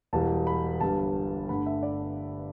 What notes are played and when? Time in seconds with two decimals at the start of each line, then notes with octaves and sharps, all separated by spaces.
0.13 E1 E2 E3 G3 A5
0.47 B5
0.80 G1 G2 G3 A5
1.49 G1 G2 D3 A3 B5
1.66 E5
1.83 D5